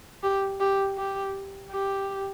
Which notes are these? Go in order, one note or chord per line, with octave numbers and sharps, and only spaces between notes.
G4
G4
G4
G4